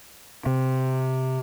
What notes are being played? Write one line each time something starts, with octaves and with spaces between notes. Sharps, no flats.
C3